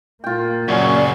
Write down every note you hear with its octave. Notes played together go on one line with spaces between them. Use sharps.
A#2 A#3 F4 G5
F#2 C#3 C#4 F#4 D5